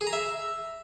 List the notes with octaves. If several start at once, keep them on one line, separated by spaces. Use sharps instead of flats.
G#4
A#5
E5